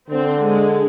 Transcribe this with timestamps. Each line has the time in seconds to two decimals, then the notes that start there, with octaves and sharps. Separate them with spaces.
0.10 D3 C4
0.45 G#3